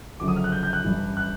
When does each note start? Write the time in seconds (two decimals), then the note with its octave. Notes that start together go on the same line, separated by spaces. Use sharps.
0.20 F#1 F#2 D3 F3 D6
0.28 D#6
0.36 F6
0.44 F#6
0.52 G6
0.63 G6
0.73 F#6
0.85 A1 G2 E3
1.17 F#6